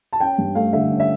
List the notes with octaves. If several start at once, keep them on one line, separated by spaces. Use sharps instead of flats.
A5
C#4 G5
G2
A3 F5
D3 E5
C#4
E5